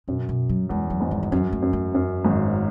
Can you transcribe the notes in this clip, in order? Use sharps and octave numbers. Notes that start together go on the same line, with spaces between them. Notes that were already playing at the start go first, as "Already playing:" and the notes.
F#2 B2
B2
F#3
E2 G#3
F#3
G#1 G#2
G#3
G#3
F#2 F#3
A3
F#2
A3
F#2
G#1 G#2